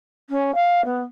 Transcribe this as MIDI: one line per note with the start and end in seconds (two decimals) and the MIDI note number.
0.29 0.51 61
0.54 0.84 77
0.84 1.01 59